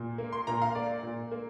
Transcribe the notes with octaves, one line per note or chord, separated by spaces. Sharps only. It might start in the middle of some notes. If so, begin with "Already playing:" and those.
Already playing: A#2
A#3
C6
A#2 A#5
F5
A#3 D5
A#2
A#3